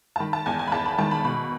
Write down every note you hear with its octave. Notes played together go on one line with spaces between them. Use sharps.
A5
D#3 B5
A5
E2 G#5
G#5
B5
E2 A5
B5
D#3 A5
B5
B2 B5